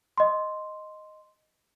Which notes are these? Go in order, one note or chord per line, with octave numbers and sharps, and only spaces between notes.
D#5 C6